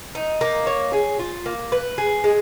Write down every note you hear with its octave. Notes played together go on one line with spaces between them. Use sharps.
D#4
A#3
C#5
G#4
F4
A#3
B4
G#4
G#3